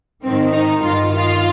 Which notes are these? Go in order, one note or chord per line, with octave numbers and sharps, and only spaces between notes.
G#2 D#3 C4
D#4
G2 D#3 F4
F4